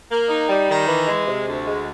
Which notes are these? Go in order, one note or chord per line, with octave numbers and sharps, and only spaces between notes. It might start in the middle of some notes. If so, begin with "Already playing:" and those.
A#3
D#4
G3
D#3
E3
G#3
C3
D2
G#3